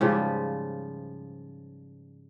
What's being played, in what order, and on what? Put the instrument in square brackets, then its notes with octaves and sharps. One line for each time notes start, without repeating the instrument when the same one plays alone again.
[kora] G#2 C#3 F3 G3